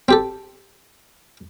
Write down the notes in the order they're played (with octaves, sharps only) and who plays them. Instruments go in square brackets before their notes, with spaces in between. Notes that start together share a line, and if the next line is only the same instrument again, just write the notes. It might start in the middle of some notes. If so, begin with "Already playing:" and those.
[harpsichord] C4 G4 A4